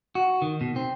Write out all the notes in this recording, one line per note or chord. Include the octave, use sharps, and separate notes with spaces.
F#4
D#3
B2
C4